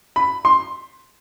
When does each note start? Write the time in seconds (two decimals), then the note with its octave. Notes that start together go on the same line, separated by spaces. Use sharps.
0.16 B5
0.45 C6